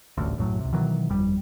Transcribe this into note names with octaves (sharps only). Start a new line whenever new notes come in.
D#1 A1 D2
B1 F#2 A2 F#3
C#2 C3
B2 D#3 E3 F#3
G1 F2 G3